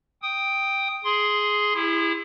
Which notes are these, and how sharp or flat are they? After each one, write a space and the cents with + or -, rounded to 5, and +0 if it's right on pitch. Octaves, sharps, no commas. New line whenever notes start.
G5 +0 D#6 +0
G#4 +5 C6 +0
E4 +5 G#4 -45